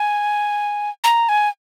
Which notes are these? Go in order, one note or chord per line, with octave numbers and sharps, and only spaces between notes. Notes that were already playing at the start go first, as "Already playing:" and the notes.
Already playing: G#5
A#5
G#5